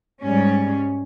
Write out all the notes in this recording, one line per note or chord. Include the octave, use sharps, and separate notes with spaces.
G#2 G3 C#4